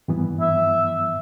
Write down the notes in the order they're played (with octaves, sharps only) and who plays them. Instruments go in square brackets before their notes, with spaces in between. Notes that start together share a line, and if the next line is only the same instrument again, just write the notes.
[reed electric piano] G2 E3 B3
[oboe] E5